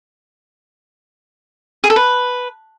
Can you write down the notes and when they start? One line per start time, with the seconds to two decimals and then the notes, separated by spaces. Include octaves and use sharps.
1.84 G#4
1.90 A4
1.96 B4